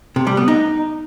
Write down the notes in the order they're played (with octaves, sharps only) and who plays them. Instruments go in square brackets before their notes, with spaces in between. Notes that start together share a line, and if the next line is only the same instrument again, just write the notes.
[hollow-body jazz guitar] C3
G3
B3
D#4